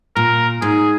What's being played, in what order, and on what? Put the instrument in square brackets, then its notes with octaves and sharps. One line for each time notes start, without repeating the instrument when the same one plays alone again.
[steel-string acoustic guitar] A#2 [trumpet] A#4
[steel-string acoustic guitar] G#2 [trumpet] G#4